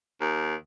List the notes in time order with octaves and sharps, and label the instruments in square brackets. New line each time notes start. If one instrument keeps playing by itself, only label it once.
[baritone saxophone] D#2